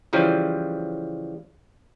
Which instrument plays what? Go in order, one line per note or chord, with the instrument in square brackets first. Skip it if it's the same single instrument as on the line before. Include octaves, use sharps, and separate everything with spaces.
[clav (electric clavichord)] C#3 E3 F3 G3